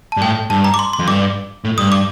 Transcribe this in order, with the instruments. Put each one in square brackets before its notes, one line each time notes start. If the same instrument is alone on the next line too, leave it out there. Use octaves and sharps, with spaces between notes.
[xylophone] A5
[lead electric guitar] G2
[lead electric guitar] A2 [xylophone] G5
[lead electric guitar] G2 [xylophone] A5
[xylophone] A#5
D6
C6
C6
[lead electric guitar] F2
[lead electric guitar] G2 [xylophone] D6
[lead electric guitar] A2
[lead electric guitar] G2 [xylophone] D#6
[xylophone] D6